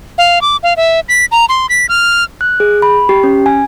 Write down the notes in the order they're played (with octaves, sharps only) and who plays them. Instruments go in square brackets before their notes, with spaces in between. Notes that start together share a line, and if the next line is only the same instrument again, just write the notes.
[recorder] F5
D6
F5
E5
B6
A#5
C6
B6
F6
[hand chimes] F#6
G#4
B5
G4
C#4
G#5